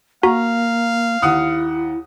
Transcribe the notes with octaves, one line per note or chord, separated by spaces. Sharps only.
A#3 F#4 F5 A#5
D#2 E4 F#5 D#6